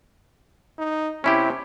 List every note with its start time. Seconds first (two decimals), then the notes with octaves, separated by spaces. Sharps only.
0.78 D#4
1.24 C3 C#4 E4 G4